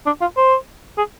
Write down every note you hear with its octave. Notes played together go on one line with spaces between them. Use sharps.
D4
F4
C5
G#4